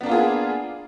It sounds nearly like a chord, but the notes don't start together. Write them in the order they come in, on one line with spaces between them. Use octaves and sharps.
B3 D4 A#3 F4 G#4